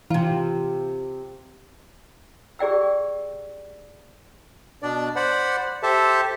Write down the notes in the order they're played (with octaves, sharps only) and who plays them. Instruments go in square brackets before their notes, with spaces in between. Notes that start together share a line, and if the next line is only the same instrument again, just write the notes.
[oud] C3 F4 [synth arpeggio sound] E3
[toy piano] G4 G#4 D5 G5 E6
[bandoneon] B2 D4 D5
C5 D5 F#5 B5
G4 A4 C5 E5 A5